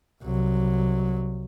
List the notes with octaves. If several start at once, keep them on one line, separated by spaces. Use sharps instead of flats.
C2 F#3